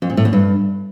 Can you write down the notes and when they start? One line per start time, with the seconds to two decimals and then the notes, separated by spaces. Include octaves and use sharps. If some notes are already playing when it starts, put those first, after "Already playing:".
0.02 F2
0.10 A#2
0.17 A2
0.25 E2
0.33 G2